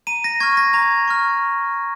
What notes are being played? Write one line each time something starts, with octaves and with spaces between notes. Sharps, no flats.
A#5 D#7
A#6
C#6 F6 G#6
A#6
A#5 G#6
C#6 F6